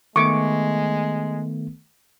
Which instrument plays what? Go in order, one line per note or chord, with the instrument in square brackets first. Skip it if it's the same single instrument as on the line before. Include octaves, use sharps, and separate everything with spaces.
[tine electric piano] D#3 A3 B3 [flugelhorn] G#3 [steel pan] C#6 D6